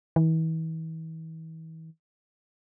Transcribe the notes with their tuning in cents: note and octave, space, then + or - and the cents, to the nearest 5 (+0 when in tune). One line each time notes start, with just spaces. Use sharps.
E3 -40